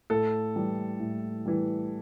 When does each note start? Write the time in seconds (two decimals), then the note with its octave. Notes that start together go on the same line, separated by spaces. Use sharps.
0.10 A2 A4
0.55 E3 G3
1.00 A2
1.46 E3 G3